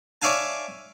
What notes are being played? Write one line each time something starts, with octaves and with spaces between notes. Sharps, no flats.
C#5 D5 E5 F5 G#5 A5